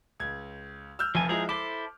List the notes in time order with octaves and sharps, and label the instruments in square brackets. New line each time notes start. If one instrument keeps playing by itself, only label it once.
[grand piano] C#2 G#6
E6 F6 G6
[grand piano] F1 F2 [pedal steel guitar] F3 G#5
[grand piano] F3 G#3 E4 [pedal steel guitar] G#4 A#5
[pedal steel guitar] E4 A4 C5 [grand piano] D6